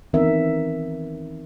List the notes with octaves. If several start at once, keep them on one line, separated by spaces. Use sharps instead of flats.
D#3 E3 B3 C4 A#4 E5